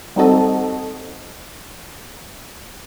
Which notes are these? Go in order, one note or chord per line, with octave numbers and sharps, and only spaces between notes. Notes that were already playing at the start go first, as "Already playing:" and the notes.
G3 C4 D#4 F#4 A4 D#5